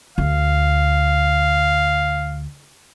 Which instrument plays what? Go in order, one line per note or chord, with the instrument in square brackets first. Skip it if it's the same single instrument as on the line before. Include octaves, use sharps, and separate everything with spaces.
[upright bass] D2 [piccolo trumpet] F5